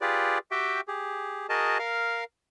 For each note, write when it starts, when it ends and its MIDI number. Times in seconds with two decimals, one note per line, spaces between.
0.01 0.38 65
0.01 0.38 67
0.01 0.38 68
0.01 0.38 71
0.01 0.38 74
0.51 0.81 66
0.51 0.81 67
0.51 0.81 76
0.51 0.81 79
0.88 1.47 67
0.88 1.47 68
1.49 1.78 66
1.49 1.78 68
1.49 1.78 70
1.49 1.78 75
1.49 1.78 81
1.79 2.24 70
1.79 2.24 77